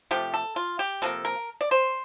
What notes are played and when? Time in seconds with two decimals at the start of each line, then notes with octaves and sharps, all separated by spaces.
0.11 C3 F3 A3 G4
0.34 A4
0.56 F4
0.79 G4
1.02 C3 F3 A#3 A4
1.25 A#4
1.61 D5
1.71 C5